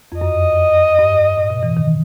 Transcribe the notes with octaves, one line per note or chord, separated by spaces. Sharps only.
F2
F#2 D#5
G2
A2
B2
E3
D#3